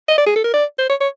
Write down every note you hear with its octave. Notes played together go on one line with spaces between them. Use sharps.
D#5
D5
G#4
A4
A#4
D5
C5
C#5
C#5